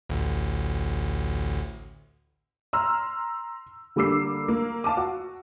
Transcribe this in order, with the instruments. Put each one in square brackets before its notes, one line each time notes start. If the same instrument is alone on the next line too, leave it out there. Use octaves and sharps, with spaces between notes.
[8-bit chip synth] A1 D2
[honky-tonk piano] A#5 C6 E6 F6
D3 G3 A#3 D6 E6 C7
A#3
F5 A5 D6
F#4